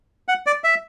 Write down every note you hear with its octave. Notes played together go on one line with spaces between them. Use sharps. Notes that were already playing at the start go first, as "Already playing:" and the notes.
F#5
D5
E5